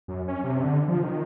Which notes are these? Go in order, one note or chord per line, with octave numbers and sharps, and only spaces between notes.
F#2
C#4
C3
D3
F3
D#3